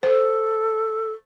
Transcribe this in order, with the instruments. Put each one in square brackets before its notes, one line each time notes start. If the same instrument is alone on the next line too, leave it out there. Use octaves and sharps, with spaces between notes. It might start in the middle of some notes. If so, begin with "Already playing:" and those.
[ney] A4 [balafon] C5